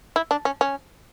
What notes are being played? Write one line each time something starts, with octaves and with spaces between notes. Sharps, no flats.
E4
D4
C#4
C#4